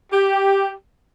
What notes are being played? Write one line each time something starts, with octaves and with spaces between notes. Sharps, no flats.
G4